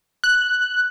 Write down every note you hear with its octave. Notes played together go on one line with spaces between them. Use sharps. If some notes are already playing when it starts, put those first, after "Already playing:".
F#6